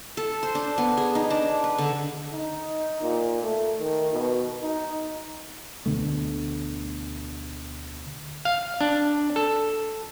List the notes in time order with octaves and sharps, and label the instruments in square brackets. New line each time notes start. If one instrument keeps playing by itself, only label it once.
[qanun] A4
C5
D4
B3
G#4
D#4
D4
B4
D3
[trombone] D#4
A#2
A3
D#3
B2
D#4
[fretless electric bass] D2 B2 D3 A3
[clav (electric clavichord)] F5
D4
A4